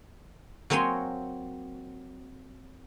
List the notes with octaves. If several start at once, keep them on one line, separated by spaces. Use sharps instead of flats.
F#3 A#3 C4 C#5 G#5 C6